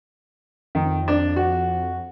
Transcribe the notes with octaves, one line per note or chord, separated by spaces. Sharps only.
F2 D#3
F2 D4
F#4